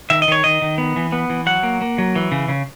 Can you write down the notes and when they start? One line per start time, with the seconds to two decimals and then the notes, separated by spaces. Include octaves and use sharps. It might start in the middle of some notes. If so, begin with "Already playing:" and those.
0.10 D#3 E5
0.22 D#5
0.28 D#3 C#5
0.44 D#3 D#5
0.62 D#3
0.78 B3
0.96 E3
1.12 B3
1.30 E3
1.46 F#3 F#5
1.63 A#3
1.81 A#3
1.98 F#3
2.15 E3
2.32 C#3
2.48 C#3